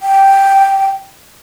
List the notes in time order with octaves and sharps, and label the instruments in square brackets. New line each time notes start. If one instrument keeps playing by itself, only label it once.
[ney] G5